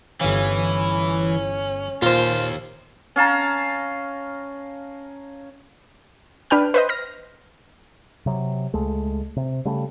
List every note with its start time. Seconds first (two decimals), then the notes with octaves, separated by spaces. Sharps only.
0.21 G1 E3 C#4 F5
2.02 D#2 A#2 F4 C5
3.16 C#4 F5 A5 A#5
6.50 D4 B4 G5 F6
6.74 B4 C5 D#5
6.89 F6 A#6
8.26 C3 F#3
8.74 C#2 G#3 A3
9.36 C3
9.65 C#3 G3 A3